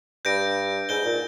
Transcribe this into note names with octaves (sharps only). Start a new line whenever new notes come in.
G2 G6 A#6 D7
G#2 G6 D7 G7
A#2